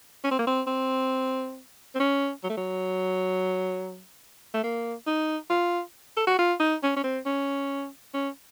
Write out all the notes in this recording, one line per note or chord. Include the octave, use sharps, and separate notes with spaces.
C#4
C4
A#3
C4
C4
C4
C#4
F#3
A3
F#3
A3
A#3
D#4
F4
A4
F#4
F4
D#4
C#4
C#4
C4
C#4
C#4